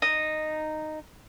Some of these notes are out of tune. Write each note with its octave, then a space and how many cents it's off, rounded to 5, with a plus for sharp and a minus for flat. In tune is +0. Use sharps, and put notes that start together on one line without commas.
D#4 -10